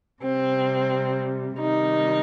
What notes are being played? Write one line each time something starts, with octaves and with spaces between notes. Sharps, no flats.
C3 G3 C4
C3 D#3 G3 D#4